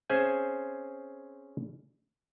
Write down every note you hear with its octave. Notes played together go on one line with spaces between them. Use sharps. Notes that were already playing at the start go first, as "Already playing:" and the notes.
C4 C#4 G#4 C5 E5 G#5